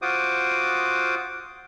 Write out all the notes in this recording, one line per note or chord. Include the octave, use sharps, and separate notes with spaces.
F4 F#4 C5 D6 D#6